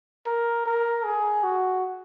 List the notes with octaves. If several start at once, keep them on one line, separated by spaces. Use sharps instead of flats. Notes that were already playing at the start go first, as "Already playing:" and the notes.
A#4
A#4
G#4
F#4